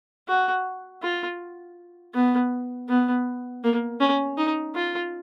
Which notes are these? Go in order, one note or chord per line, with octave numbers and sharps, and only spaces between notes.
F#4
F4
B3
B3
A#3
C#4
D#4
F4